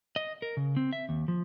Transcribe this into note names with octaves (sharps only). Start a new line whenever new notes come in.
D#5
A#4
C#3
C4
E5
D#2
F3